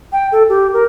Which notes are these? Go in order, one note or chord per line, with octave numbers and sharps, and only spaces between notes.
G5
A4
G4
A#4